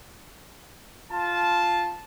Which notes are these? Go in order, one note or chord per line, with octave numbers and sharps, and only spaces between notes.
F4 A5